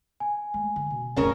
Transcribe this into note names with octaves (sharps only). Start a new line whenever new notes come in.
G#5
G#3
D3
B2
D1 G1 C#3 C#4 A#4